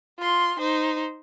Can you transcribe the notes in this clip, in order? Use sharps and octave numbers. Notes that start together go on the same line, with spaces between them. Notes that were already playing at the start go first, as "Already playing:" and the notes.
F4 C6
D#4 C5